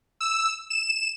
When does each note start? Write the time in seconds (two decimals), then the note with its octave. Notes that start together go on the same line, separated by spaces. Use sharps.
0.21 E6
0.70 E7